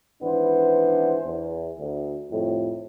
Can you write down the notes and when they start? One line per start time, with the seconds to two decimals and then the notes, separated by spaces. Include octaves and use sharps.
0.22 G#1 E3 B3 D4 C5
1.25 E2
1.79 D2
2.31 C2 F2 A2